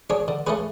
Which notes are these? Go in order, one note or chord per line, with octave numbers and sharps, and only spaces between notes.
D4 G#4 C#5
D3
A3 C#4 G#4 B4